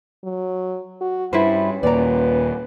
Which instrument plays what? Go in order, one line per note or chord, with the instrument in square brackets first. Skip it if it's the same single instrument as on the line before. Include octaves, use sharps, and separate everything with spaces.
[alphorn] F#3
F#4
[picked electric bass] G2 [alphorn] C#4 [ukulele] E4 B4 C5
[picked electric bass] D#2 A#2 [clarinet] B4 [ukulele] D5 A#5